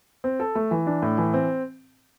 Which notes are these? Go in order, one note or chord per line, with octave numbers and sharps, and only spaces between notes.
C4
A4
A3
E3
D4
A2
E3
C4